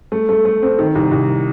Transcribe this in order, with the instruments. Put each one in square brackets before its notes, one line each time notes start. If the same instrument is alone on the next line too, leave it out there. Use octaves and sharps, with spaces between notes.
[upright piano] A3
A3
A3
C4
D#3
C2
C2